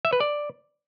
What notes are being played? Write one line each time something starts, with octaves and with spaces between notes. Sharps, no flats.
E5
B4
D5